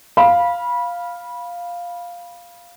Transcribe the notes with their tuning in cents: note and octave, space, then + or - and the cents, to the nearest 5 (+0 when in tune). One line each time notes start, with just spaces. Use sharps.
F5 +0 B5 -20